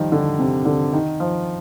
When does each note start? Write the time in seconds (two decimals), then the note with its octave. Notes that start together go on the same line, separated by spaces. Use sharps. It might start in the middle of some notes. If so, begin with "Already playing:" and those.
Already playing: D#3 F3 G3
0.12 D3
0.39 C3
0.65 D3
0.93 D#3
1.20 F3